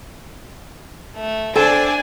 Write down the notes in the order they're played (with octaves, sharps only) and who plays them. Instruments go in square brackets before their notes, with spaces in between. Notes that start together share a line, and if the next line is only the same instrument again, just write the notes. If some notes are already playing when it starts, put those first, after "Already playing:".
[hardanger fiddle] A3
[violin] D4 D5 [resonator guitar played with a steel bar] A4 G5 [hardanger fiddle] C5 [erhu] G#5